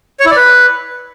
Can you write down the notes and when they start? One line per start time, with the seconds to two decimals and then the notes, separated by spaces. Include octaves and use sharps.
0.20 C#5
0.26 E4
0.31 D5
0.37 B4